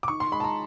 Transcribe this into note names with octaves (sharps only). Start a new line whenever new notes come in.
D6
D#3 C#6
C6
G#3 B5
A5
A#5